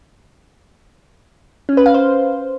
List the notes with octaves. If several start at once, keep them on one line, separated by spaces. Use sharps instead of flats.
C#4
B4
F5
C5